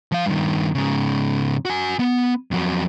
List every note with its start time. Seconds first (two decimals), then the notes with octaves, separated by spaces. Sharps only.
0.12 F3 F5
0.26 G2 D#3
0.75 G#2 C#3
1.65 F#4 G#5
2.00 B3
2.51 F2 F#3